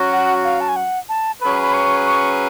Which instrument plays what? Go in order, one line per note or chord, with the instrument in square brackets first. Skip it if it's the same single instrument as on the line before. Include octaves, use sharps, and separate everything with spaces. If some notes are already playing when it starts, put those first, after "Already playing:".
Already playing: [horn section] F#3 C#4 F#4
[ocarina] F#5
F5
A5
G#5
F#5
A5
[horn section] F#3 C#4 G#4 B4 [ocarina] B5
[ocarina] B5
C#6
C#6